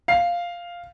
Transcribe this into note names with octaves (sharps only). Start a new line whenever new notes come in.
F5 C7